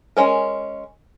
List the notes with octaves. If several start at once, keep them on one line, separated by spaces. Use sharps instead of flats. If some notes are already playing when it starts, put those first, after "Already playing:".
G#3 C#4 A#4